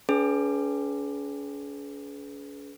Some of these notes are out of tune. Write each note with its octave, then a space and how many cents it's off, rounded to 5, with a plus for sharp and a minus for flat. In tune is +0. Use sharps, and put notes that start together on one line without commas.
C#4 +45 G#4 +35 B4 +0